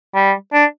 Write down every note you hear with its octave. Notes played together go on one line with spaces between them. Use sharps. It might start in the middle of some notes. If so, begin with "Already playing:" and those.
G3
D4